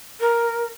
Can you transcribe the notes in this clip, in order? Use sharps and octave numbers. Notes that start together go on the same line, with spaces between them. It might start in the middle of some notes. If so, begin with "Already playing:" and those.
A#4